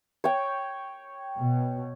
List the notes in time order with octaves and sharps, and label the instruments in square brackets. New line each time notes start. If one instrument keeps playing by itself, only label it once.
[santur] C#5 G5
[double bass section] B2